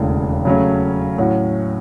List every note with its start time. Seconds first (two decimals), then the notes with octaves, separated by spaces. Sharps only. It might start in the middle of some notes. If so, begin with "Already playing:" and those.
Already playing: E1 D#2 C#3 E3 A3
0.45 C#3 F#3 A3 C#4
1.18 A2 F#3 C#4 F#4